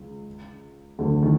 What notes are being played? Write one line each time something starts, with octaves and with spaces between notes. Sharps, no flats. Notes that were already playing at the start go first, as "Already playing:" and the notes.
Already playing: C#2
D2 D3
D#3